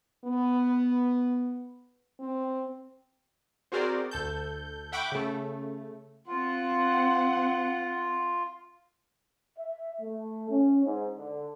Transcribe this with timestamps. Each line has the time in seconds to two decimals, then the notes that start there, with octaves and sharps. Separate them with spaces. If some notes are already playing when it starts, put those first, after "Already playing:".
0.25 B3
2.20 C4
3.72 C4 F#4 G#4 A#4 C5 D5
4.11 D2 A4 G6
4.92 E5 F#5 G5 B5 C#6 D6
5.12 C#3 A3
6.28 C4 F4 F#5
9.58 E5
10.01 A3
10.50 C#4
10.85 G#2
11.18 D3